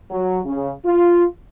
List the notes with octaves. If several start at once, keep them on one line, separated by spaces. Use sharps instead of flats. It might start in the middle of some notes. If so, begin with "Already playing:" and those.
F#3
C#3
F4